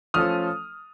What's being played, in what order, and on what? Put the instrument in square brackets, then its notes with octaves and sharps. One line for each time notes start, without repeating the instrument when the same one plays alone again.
[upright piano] F3 A3 C#4 F4 A4 [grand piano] D#6 F6